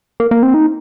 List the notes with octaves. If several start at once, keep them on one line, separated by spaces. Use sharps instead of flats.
A#3
A#3
C4
D#4